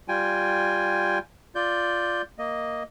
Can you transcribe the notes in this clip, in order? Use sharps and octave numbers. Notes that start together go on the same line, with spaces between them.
G3 F4 G5 G#5
F4 D5 G6
A#3 D#5